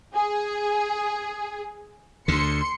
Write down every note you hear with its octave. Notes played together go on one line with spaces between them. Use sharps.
G#4
D2 D3 C6 C#7